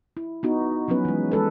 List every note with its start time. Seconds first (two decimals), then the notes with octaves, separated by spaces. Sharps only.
0.17 E4
0.43 B3 D#4 F#4
0.88 F3 F#3 B3 C#4 B4
1.05 E3 G#3
1.32 G#3 A4 B4